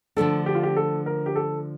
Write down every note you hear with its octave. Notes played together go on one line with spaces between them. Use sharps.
D3 F3 A3 D4 A4
G4
F4
G4
A4
A#4
G4
A4